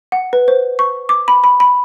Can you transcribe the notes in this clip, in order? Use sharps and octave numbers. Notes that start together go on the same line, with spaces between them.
F#5
B4
C5
C#6
D6
B5
B5
B5